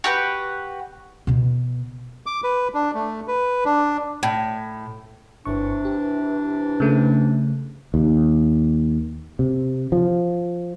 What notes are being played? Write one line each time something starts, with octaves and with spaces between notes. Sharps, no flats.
F#4 G4 B4
B2 B3
D6
B4
D4
A3
B4
D4
A2
G1 C3 E3 D4 C#6
G4
C#3 A3
D#2
C3
F3